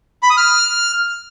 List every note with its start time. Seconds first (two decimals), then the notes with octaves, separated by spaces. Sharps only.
0.23 B5
0.30 D#6
0.37 F6